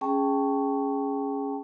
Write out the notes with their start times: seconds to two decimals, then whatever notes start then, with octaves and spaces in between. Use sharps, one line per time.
0.01 C#4 G#4 G5 A5 C#6